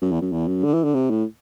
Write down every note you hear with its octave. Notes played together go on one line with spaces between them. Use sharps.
F#2
E2
F#2
E2
F#2
D3
E3
D3
C3
A2